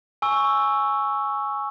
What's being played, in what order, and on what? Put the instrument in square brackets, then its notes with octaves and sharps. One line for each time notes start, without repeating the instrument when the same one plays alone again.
[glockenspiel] G#5 C#6 E6